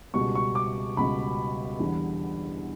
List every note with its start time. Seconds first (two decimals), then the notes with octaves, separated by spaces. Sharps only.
0.14 C#2 B2 G3 C#6
0.35 C#6
0.55 D6
0.97 C#2 B2 G3 B5
1.79 E2 D3 G3